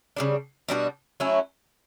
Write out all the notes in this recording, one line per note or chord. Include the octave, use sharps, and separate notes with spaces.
C#3 G3 D4
B2 G3 D4 F#4
F#3 A3 C#4 E4